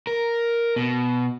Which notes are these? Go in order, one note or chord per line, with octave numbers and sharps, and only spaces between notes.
A#4
B2